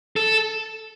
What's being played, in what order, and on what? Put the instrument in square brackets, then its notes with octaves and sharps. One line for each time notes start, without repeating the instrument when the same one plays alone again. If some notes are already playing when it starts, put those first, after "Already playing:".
[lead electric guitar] A4